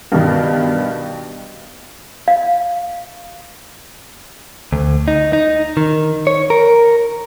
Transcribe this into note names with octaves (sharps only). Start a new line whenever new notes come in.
G2 B2 D#3
F5
D2
D#4
D#4
D#3
C#5
A#4